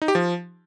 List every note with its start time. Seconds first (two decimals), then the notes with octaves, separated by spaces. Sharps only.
0.02 D#4
0.08 G4
0.15 F3